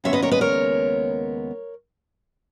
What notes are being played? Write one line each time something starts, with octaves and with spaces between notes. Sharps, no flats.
D#2 C#3 G#3 B3 C#5 E5
B4 D#5
A#4 C#5
B4 D#5
A#4 C#5